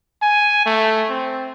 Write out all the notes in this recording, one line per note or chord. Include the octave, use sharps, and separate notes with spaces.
G#5
A3
C4